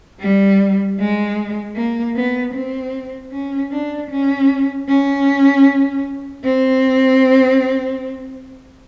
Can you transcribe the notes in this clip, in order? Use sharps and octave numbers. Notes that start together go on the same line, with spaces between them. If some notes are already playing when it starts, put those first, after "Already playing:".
G3
G#3
A#3
B3
C4
C#4
D4
C#4
C#4
C4